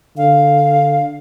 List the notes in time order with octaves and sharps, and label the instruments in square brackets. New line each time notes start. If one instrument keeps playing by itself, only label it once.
[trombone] D3 [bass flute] F5